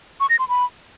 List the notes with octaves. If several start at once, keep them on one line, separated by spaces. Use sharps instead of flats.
C#6
A#6
C6
B5